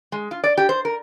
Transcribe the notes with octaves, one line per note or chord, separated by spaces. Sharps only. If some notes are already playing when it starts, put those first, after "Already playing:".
G#3
F4
D5
G4
C5
A#4